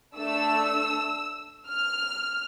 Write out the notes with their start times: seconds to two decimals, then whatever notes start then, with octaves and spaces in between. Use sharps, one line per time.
0.17 A3 D4 A4 E6
1.69 F6